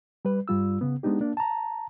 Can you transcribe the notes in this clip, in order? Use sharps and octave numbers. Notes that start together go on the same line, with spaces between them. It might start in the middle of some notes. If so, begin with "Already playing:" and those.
G3 B4
G2 G3 F4 E6
C#3 B3
G#3 B3 D4 D#4 G4
A#3 D4
A5 A#5